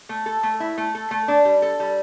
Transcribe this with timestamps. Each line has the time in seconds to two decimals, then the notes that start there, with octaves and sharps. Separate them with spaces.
0.09 A3
0.26 A4
0.43 A3
0.60 E4
0.78 A3
0.95 A4
1.11 A3
1.28 D4
1.45 G3
1.62 A4
1.80 G3